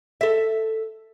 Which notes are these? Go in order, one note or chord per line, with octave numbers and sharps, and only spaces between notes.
A4 E5